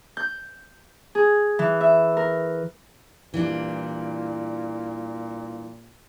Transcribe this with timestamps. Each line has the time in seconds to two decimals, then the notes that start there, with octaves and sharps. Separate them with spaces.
0.17 G6
1.15 G#4
1.59 E3
1.81 E5
2.17 A#4
3.34 A#2 E3 G3 D4